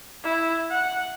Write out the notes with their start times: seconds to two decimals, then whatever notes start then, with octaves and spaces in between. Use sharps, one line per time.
0.24 E4
0.71 F#5